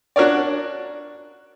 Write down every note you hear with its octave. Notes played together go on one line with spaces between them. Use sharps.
D4 F#4 A#4 C#5 D5